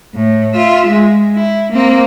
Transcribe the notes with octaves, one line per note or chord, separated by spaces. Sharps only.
A2
F4 E5
G#3
E4
A#3 C4